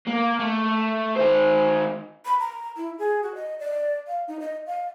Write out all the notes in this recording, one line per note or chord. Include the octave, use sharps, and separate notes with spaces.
A#3
A3
D#3 C5
B5
A#5
E4
G#4
F#4
D#5
D5
F5
D#4
D#5
F5